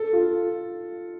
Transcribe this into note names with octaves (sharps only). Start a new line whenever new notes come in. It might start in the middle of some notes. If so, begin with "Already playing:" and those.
Already playing: A4
F4